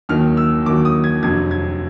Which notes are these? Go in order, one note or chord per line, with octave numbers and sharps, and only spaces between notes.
D#2 D#3 F#3 F6
E6
D#2 D#3 F#3 D6
D#6
G#6
F1 F2 D3 F#3 G#6
G#6